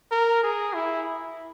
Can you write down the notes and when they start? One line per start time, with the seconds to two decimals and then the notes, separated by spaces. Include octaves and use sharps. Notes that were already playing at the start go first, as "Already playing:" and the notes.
0.11 A#4
0.43 G#4
0.74 E4